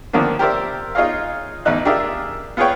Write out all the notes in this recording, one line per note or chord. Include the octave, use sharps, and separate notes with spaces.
D3 D#3 F3 A#3 C#4 D4
G4 A#4 C5 D5 E5
D#4 F4 G#4 C#5 D#5 F5
A1 E2 D#4 F#6
D4 F4 G4 G#4 A#4 E5
B3 F4 G#4 B4 C#5 G5